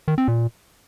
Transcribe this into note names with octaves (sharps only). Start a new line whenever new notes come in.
D#3
C4
A#2